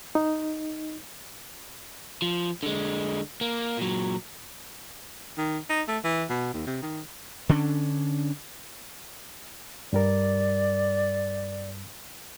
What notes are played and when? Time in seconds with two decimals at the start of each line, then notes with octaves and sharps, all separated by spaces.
0.15 D#4
2.22 F3
2.63 D3 G#3
3.41 A#3
3.77 A#2 F#3
5.38 D#3
5.69 D#4
5.88 A3
6.04 E3
6.29 B2
6.54 D#2
6.67 C3
6.82 D#3
7.49 D3 C#4 D4
9.93 G2 G3 A#4 D5